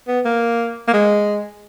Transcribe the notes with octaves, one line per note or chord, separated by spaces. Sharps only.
B3
A#3
A#3
G#3